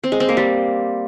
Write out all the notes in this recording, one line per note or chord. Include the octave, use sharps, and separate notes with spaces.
C4
G#3
C4
A#3
G3